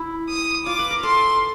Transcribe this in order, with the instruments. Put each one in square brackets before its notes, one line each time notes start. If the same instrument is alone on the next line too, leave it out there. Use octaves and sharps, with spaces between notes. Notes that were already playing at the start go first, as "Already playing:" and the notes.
Already playing: [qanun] E4
[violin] D#6
[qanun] F4 [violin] D6
[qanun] B4
A#4
[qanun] A4 [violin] C6